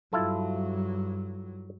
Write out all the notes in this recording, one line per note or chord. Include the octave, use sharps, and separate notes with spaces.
G2 F#3 E4 F4 A4